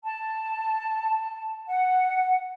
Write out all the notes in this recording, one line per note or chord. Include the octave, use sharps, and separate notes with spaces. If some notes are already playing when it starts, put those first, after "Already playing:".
A5
F#5